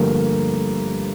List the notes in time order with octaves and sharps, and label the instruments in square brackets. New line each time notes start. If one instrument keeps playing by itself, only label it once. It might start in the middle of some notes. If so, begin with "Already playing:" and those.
Already playing: [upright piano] G2 D3 F3 A3 A#3